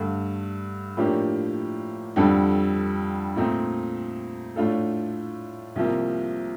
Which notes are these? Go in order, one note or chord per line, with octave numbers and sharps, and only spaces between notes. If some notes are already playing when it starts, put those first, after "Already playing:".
Already playing: G2 D3 A3
A2 F3 A#3 D4 G4
F2 D3 G3 D4 A4
A#2 A3 C4 D#4
A2 A3 D4 F4 A4
C2 C3 F3 A#3